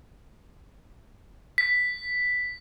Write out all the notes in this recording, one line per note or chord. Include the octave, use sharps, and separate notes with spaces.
B6